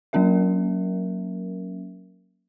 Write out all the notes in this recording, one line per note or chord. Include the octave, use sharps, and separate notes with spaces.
F#3 A#3 C#4 A#4 E5